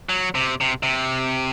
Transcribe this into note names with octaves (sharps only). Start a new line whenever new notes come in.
F#3
C3
C3
C3